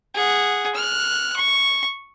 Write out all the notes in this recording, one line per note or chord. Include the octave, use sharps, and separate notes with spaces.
G#4 F#5
F6 F#6
C#6